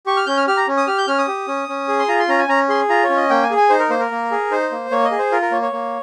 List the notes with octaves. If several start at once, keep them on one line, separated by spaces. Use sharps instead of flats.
G4 C#6
F6
C#4 G6
F6
G4 F6
A#5
C#4
D#6
G4 F6
G6
C#4 F6
D#6
G4
C#4
C#4
G#4
C6
F4 A#5
C6
C#4 A#5
G#5
C#4 A#5
G#4 C6
F4 A#5
C#5
C#4
D#5
A#3 G5
G#5
G#4
G#5
D#4 C5
A#4
A#3 C5
A#4
A#3
G#4
D#4 C5
A#3
A#3 C#5
D#5
G#4
C5
F4 A#4
A#4
A#3 C#5
C#5
A#3